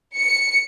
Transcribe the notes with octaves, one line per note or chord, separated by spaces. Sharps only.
C#7